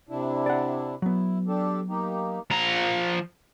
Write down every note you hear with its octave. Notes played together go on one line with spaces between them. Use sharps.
C3 D4 E4
D5 F#5
F#3 B3 E4
D4 G4 A4
A#3 D#4 G4
F3 A#5